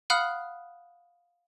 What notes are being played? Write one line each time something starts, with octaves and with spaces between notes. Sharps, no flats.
F5 F#5 B5 D#6 F6 F#6